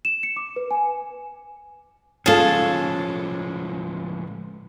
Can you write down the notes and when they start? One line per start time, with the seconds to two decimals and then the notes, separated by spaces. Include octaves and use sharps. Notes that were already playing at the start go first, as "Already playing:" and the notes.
0.05 E7
0.23 C#7
0.36 D6
0.56 B4
0.71 G#5
2.26 A2 F3 G#3 C#4 F4 G#4 A4